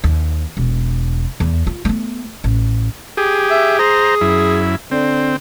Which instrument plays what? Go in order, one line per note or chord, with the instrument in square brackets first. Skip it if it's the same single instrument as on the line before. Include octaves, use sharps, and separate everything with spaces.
[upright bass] D#2
E1
E2
F4
A3 B3
A1
[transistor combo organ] G4 G#4
[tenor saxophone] E5
[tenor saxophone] G#4 [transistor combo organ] C5 A#5
[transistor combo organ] F#2 E4
[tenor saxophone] D3 [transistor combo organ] C4